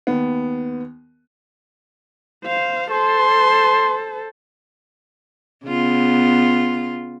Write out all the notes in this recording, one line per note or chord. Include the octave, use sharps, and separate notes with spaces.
D#2 B3
C5 F5
A4 C5 C6
C#3 B3 F4